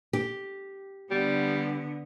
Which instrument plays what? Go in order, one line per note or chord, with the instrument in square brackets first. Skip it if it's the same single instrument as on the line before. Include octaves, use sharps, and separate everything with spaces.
[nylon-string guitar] G4
[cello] D3 B3 [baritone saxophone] G3